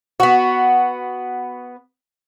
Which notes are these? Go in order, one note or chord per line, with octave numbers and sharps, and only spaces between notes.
B3 F#4